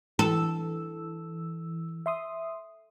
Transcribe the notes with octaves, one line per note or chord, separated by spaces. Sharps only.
E3 A4 E6
E5 C6 D#6